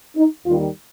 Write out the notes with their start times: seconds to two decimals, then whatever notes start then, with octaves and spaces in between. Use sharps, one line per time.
0.16 D#4
0.45 D#2 D#3 G3 F4